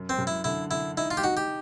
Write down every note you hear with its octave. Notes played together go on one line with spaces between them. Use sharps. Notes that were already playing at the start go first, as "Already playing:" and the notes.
Already playing: F#2
C4
F#2
E4
D3 E4
D3 E4
D#4 E4
F4
G4
D#4 F#4
G4